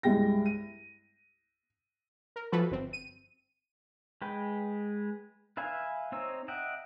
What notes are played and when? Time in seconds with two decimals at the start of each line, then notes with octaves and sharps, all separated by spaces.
0.03 C2 G2 G3 G#3 G5 A#6
0.46 D#7
2.36 A#4
2.52 E3 F3 F4 F#4 A4 B4
2.71 G1 C4
2.93 D#7
4.22 G#3 B4 G5
5.57 B4 E5 F5 G#5
6.12 C4 D#4 C#5 E6
6.48 D#5 E5 F#5 G5